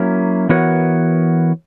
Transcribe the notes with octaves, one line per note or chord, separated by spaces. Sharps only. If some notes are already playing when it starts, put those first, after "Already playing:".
Already playing: F#3 A#3 C#4 E4
E3 B3 F#4 A#4 C#5